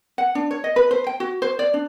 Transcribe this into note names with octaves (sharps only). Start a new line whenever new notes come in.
F#5
D4
C#5
D#5
B4
C5
G5
F#4
C5
D5
D4